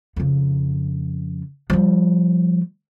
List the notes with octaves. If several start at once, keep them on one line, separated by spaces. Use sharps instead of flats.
F2 C#3
F3 G3